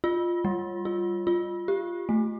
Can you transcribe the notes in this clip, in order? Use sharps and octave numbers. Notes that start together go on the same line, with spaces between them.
F4
G3
F4
F4
G4
A3